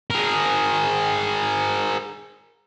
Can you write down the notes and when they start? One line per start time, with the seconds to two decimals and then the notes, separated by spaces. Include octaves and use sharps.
0.10 G#4 A#4